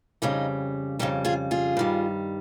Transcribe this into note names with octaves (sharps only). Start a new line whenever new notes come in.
F2 C#3 G3 D#4
F2 C#3 G3 D#4 G4
F4 G#4
F4 G#4
G2 D#3 G3